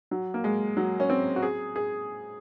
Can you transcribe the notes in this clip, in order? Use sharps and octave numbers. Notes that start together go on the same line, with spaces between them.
F#3
A#3
G#3
F#3
C#4
C4
F#4
G#4
G#4